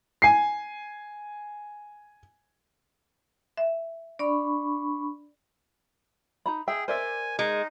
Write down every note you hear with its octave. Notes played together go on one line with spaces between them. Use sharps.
G#5 C7
E5
D4 D5 B5 C#6
D#4 A#5 B5
G#4 E5 G5
A#4 C5 D5 E5 G#5
G#3 D#4